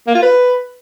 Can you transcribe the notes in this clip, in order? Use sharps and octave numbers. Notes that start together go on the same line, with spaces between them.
A#3
F4
B4